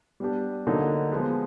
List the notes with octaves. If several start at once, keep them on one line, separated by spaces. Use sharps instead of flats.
G3 B3 D4 G4
D3 F#3 A#3 D#4
F3 G#3 B3